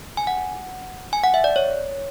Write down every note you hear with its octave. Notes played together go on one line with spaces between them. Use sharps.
G#5
F#5
G#5
F#5
E5
D5
C#5